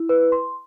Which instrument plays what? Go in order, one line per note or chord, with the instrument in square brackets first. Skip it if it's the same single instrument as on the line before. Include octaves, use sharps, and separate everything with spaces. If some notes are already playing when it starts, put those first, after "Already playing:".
Already playing: [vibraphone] E4
[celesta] B4
C6